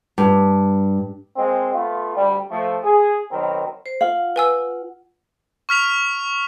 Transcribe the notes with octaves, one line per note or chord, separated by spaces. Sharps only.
G2
G#3 A#3 C4
A3 B3 F4
D2 D3 G3
F3 A3
G#4
B2 D#3 F#3 C4 A#4
C5
F4 F5 F#5
B4 G#5 E6
C#6 F6 B6 F7